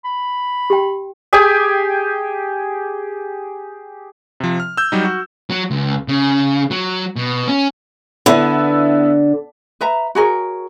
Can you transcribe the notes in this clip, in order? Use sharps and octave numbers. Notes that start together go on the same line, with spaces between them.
B5
G4 G5
G4 G#4 G5 G#5
C3 F3
F6
E6 G6
F#3 G3 D#4
F#4
F#3
C#2
C#3
F#3
B2
C#4
D3 B3 E4
B4 E5 A#5
F#4 G#4 A#4 C#5